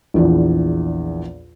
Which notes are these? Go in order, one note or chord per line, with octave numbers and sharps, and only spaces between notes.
A#1 E2 A#2